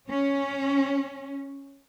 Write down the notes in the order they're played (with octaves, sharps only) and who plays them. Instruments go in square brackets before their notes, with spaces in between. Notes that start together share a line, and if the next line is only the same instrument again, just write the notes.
[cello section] C#4